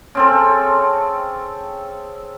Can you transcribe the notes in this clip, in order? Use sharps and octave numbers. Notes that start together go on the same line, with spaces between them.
C#3 C4 A4